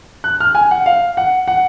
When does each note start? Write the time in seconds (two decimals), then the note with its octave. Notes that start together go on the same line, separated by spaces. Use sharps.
0.24 F#6
0.40 F6
0.55 G#5
0.71 F#5
0.86 F5
1.17 F#5
1.48 F#5